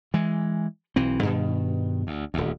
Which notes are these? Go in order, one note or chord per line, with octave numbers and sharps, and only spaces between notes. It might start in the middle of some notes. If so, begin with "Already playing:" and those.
E3 G#3
B1 E3 C4
G2 B2 D#3
D2
D#1 D2